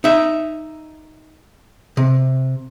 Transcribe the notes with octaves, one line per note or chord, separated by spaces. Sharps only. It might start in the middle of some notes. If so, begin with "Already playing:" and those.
D#4 E5
C3